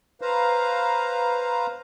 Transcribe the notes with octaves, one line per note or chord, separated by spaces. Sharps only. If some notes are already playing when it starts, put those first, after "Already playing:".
B4 C5 F5 A#5